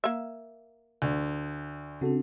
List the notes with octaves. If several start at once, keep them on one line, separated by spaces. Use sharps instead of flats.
A#3 E5
D2
C#3 C4 D4 F#4 A4